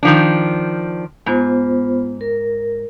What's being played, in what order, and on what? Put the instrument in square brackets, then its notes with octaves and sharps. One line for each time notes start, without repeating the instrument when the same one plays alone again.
[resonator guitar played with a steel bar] D#3 F3 D4
[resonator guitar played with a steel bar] G#2 [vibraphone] B3 F4 C5
[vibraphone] A#4